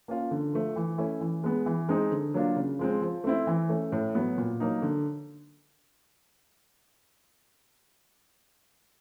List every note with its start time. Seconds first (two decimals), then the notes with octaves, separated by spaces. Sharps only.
0.08 A#3 C#4 F4
0.31 D3
0.53 F3 A3
0.76 E3
0.98 A3 C#4 E4
1.21 E3
1.44 G#3 B3
1.66 E3
1.89 G#3 C4 D#4
2.11 D3
2.34 F#3 A#3 D4 F4
2.56 C#3
2.79 F3 G#3 C4
3.02 F3
3.24 A3 C4 E4
3.47 E3
3.69 A3 C#4
3.92 A2
4.15 F#3 B3
4.38 A#2
4.60 F#3 A#3 D#4
4.82 D3